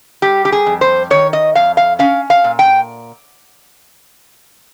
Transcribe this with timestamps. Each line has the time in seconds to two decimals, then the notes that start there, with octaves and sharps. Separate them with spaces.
0.22 G3 G4
0.45 G4
0.52 G#4
0.66 F2
0.81 C5
1.10 D#3 C#5
1.33 D#5
1.55 F2 F5
1.77 F5
1.99 C#4 F5
2.30 F5
2.44 A#2
2.59 G5